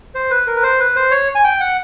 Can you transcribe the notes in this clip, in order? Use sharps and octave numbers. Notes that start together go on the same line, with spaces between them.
C5
B4
A#4
B4
C5
B4
C5
C#5
G#5
G5
F#5